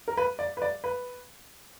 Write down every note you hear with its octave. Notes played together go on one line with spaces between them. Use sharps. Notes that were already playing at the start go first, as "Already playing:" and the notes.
A#4
B4
D5
B4
D5
B4